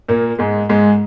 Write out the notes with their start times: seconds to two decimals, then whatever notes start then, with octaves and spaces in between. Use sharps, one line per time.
0.09 A#2 A#3
0.39 G#2 G#3
0.69 G#2 G#3